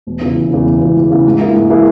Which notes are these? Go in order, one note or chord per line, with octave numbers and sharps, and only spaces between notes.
E1
E2 C#3 E3
E1
E2 C#3 E3
E1
E2 C#3 E3
E1
E2 C#3 E3
G#2
E3 A#3 E4 G#4
G#2
E3 A#3 E4 G#4